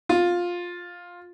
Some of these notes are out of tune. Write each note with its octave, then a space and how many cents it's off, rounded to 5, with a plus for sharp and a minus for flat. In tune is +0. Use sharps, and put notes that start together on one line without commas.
F4 +10